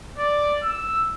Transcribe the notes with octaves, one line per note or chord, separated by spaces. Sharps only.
D5
E6